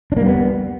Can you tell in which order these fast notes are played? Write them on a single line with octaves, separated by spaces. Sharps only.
D4 A#3 G3 B3